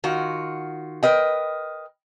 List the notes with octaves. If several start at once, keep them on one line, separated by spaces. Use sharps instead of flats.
D#3 F4 F#4
A#4 B4 D#5 G5